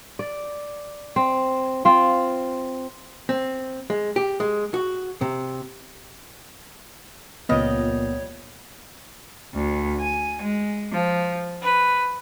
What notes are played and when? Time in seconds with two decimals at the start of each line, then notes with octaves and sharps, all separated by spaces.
0.19 D5
1.16 C4
1.85 C4 F4
3.29 C4
3.90 G#3
4.16 G4
4.40 G#3
4.74 F#4
5.21 C3
7.49 C#2 A#2 F3 G3 B3 C#5 D#5
9.55 D2
10.00 G#5
10.44 G#3
10.93 F3
11.62 B4